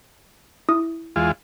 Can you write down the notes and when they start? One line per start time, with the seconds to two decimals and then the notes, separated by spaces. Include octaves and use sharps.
0.69 E4 D#6
1.16 E2 G#3 F4